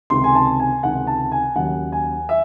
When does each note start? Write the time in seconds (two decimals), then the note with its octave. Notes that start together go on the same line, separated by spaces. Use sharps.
0.10 C#2 C3 D#3 C6
0.24 G#5
0.35 A5
0.60 G#5
0.83 C#2 C3 D#3 F#5
1.07 A5
1.32 G#5
1.56 D#2 C#3 F#3 F#5
1.92 G#5
2.29 E5